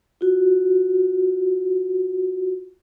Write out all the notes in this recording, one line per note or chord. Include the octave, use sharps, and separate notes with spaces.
F4 F#4